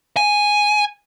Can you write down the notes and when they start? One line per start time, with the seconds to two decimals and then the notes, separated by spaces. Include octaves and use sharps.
0.17 G#5